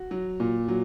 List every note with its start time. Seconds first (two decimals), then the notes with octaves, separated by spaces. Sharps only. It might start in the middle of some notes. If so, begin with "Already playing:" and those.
Already playing: F#4
0.11 F#3
0.40 A#2
0.68 F#3